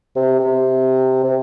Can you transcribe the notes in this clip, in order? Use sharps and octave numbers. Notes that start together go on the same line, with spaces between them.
C3
C3
C3